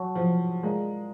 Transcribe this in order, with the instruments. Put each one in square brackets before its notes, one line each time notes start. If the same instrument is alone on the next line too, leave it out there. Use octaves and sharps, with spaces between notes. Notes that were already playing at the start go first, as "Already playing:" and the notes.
Already playing: [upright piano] F#3 [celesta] C#5 F#5 A5 C#6
[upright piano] F3
[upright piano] G#3 [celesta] F4 A#4 D5 F5 A#5